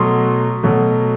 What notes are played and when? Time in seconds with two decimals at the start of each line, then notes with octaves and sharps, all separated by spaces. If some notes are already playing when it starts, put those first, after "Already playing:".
Already playing: B2 F#3 A3 C6
0.63 B2 F#3 A3